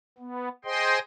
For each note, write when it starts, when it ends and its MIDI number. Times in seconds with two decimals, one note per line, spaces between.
0.18 0.49 59
0.65 0.99 68
0.65 0.99 72
0.65 0.99 75
0.65 0.99 79
0.65 0.99 84